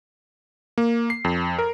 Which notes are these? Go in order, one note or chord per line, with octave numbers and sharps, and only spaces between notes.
A#3
C7
F2
A#4